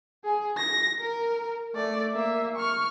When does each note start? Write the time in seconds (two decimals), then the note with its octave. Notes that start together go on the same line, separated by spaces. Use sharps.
0.24 G#4
0.58 A#6
1.00 A#4
1.75 A3 D5
2.13 A#3 E5
2.56 C#6 F6